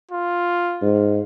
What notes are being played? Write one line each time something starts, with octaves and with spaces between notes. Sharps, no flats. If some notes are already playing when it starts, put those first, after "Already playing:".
F4
G#2